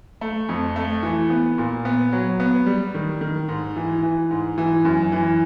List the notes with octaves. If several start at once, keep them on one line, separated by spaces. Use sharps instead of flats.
A3
F2
A3
E3
B3
A#2
B3
F#3
B3
G3
D#3
D#3
G#2
E3
E3
G#2
E3
F#2
E3